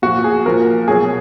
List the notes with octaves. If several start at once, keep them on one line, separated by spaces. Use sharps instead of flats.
A#2 F3 F#4
G#4
A#2 F3 A#4
B2 F#3 G#4